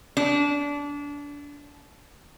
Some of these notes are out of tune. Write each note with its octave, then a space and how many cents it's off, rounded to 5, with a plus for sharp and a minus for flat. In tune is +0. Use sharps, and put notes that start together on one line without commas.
D4 -25